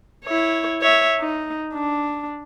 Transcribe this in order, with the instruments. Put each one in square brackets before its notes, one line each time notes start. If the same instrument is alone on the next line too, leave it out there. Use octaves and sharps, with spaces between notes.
[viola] E4 C#5
C#5 E5
D#4
D4